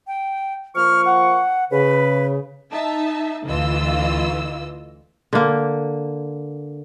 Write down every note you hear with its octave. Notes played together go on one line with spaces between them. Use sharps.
G5
F3 A#3 C#6 F6
F#5
C#3 B4
D#4 E5 A5
D2 E3 F4 D#5 E6
D3 A#3